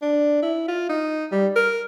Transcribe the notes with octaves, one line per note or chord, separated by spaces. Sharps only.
D4
E4
F4
D#4
G3
A#4